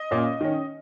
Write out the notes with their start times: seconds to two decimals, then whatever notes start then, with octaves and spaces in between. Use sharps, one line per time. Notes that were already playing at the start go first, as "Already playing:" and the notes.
Already playing: D#5
0.11 A#2 A#3 C#4
0.41 D#3 C#4